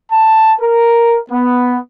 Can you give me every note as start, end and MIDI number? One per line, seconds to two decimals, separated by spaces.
0.12 0.52 81
0.59 1.17 70
1.30 1.77 59